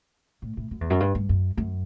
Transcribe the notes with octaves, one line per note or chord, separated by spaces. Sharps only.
A2
A2
F#2
E2
F#2
G2
G2
F#2
F#2